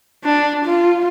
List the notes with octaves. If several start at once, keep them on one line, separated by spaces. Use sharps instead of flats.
D4
F4